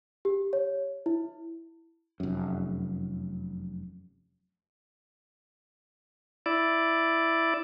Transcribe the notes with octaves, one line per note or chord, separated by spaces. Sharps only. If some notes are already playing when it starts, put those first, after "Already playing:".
G4
C#5
E4
F1 F#2
E4 D5